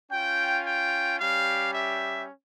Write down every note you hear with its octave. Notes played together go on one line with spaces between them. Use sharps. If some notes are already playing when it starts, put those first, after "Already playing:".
C#4 F4 G5
G5
G3 C#4 G4 F5
E5